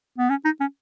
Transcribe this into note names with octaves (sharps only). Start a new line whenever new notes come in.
B3
C#4
D#4
C#4